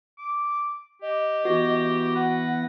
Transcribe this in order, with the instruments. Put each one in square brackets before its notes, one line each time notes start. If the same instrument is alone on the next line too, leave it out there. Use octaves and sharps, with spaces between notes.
[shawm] D6
[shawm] G4 [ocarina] D#5
[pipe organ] E3 B3 A#6 [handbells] F#4
[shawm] B4 [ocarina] F#5